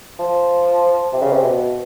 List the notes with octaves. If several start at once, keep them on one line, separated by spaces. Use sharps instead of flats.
F3
C3
C#3
C3
B2